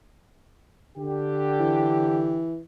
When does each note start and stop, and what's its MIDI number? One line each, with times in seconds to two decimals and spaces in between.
0.97 2.48 50
0.97 2.48 67
1.60 2.60 52